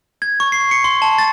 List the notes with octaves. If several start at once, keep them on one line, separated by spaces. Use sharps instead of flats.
G#6
C#6
C7
C#7
C6
A5
A6